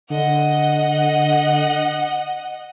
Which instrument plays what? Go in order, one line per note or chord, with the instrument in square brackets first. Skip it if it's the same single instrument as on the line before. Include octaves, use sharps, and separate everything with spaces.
[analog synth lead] D3 [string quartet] D#5 F#5